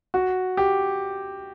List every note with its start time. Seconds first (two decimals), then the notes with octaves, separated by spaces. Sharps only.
0.14 F#4
0.57 G4